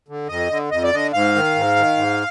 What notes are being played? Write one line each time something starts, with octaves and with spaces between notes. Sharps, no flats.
D3
F2 D#5
D3
F2 D#5
D5
D3 D#5
G#2 F5
D#3
G#2
D#3
G#2